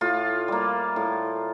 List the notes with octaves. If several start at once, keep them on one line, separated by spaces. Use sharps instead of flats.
A2 F4
G3 A#3
A2